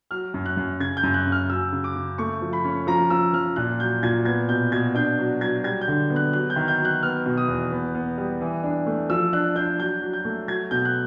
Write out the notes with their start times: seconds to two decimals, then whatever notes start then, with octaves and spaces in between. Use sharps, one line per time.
0.11 F#3 F6
0.34 F#2
0.46 F#6
0.57 F#2
0.80 C#3 G#6
0.97 G6
1.03 F#2
1.14 F#6
1.26 C#3
1.32 F6
1.49 F#3 E6
1.72 C#3
1.84 D6
1.95 C#3
2.18 A3 C#6
2.41 F3
2.53 B5
2.64 C#4
2.87 F3 A#5
3.10 F3 E6
3.33 F3 F6
3.56 A#2 F#6
3.80 F#3 G6
4.03 A#2 G#6
4.25 B3 G#6
4.49 B2 G6
4.72 B2 G#6
4.95 D4 G6
5.19 F#3
5.41 F#3 G#6
5.64 G3 G#6
5.81 G6
5.88 D3
6.10 B3
6.16 F#6
6.33 F#3 F#6
6.50 G6
6.56 D#3
6.68 G6
6.79 F#3
6.85 F#6
7.02 B3 F6
7.26 B2
7.38 D#6
7.48 E2
7.71 B3
7.95 B3
8.18 G3
8.41 E3
8.63 D4
8.86 A3
9.10 F3 E6
9.33 D4 F#6
9.55 D4 G6
9.78 F#3 G6
10.02 F#3
10.13 G6
10.25 A3
10.48 F#3 G#6
10.71 B2 G6
10.85 F#6